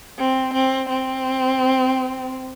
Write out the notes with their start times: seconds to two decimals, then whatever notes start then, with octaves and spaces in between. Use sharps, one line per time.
0.18 C4
0.54 C4
0.89 C4